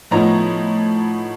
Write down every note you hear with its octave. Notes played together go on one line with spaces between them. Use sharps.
A2 F3 B3 D#4 C#5 A#5